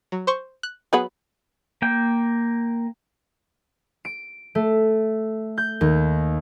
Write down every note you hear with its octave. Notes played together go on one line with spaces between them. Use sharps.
F#3
C5 C6 C#6
F#6
F#3 B3 G#4 B4 F#5
A#3 G5
D7
A3
G6
D#2